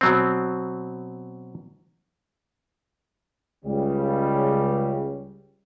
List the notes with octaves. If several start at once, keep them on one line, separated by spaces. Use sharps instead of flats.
B2 F#3 C4
C#2 C#3 G3